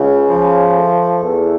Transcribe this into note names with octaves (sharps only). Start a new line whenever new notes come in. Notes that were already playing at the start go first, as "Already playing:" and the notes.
Already playing: C#2 C#3
F3
A3
E2